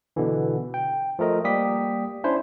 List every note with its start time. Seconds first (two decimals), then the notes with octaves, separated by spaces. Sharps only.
0.16 B2 D3 E3
0.74 G5
1.19 F3 A3 A#4 D#5
1.44 G3 A#3 G4 D#6 B6
2.24 C#4 D4 E4 C5